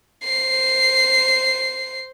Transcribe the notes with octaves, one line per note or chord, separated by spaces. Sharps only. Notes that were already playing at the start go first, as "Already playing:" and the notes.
C5 C7